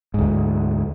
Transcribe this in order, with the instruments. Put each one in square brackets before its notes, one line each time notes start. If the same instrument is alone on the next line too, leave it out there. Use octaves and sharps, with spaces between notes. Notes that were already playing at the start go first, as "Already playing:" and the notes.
[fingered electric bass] D2 G#2